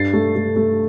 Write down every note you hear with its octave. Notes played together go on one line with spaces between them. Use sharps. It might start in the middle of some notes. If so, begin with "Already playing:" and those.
Already playing: G2 A6 C7
A3
A3
A3